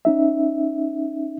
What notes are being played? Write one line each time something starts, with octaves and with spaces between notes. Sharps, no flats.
C#4 D#4 E5